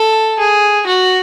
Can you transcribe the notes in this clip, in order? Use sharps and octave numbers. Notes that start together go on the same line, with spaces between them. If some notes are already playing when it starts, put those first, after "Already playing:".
Already playing: A4
G#4
F#4